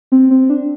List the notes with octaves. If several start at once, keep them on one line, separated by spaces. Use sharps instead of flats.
C4
C4
D4